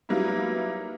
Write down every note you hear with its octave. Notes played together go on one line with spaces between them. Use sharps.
F#3 G3 A#3 B3 D#4 E4